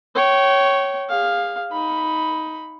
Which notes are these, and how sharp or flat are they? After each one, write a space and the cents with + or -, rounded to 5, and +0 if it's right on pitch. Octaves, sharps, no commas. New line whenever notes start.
C#5 +0 G5 -30
G#4 -35 F5 +5
D#4 +15 B5 +0